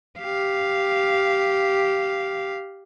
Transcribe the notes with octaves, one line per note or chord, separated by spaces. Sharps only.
G4 F5